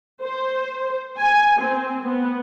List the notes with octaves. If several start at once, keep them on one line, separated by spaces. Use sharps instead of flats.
C5
G#5
C4
B3